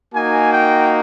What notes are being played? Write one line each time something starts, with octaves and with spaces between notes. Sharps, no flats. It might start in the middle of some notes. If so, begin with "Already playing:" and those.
A#3 D#4 F#4 G#5
G5